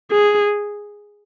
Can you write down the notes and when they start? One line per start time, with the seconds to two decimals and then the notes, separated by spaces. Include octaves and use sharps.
0.11 G#4